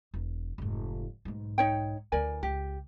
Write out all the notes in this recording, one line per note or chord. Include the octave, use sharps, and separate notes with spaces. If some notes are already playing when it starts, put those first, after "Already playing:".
E1
F1 G#2
B1 G#2
D#4 C#5 G5
D2 E3 A#4 D5 G#5
C#2 G4